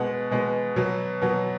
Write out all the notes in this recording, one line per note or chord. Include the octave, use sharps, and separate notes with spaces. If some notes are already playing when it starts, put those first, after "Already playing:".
Already playing: B2 G#3 B3 F#5
B2 G#3 B3
B2 F#3 B3
B2 F#3 B3